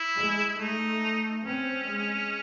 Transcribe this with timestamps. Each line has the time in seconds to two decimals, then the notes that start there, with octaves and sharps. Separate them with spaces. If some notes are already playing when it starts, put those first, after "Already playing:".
Already playing: E4
0.17 G#3
0.58 A3 D#4
1.43 C4 C#4
1.86 G#3